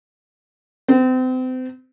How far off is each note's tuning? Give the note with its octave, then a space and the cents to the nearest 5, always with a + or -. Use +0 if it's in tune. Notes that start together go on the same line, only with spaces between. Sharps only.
C4 -35